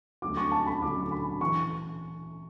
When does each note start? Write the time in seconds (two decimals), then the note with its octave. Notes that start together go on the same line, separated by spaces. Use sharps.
0.22 D2 D3 F#3 D6
0.37 C#6
0.52 A5
0.67 B5
0.82 D2 D3 F#3 D6
1.11 B5
1.41 E3 C#6